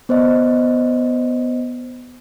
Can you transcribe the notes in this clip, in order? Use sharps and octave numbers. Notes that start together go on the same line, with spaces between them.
B3 C5 D5 D#5